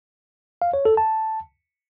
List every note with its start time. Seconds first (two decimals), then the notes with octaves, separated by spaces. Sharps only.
0.62 F5
0.74 C#5
0.85 A4
0.97 A5